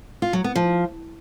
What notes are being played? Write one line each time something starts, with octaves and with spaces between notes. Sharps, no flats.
F4
F#3
B3
F3